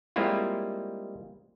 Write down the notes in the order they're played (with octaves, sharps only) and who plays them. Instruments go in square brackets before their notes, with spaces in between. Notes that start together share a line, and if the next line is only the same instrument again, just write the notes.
[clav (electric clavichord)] G3 G#3 A#3 C4 E4 F4